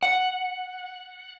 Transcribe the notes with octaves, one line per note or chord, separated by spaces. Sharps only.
F#5